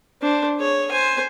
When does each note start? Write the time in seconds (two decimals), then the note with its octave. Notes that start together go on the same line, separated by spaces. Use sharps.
0.22 D4 C5
0.57 G#4 C#5
0.91 C5 G#5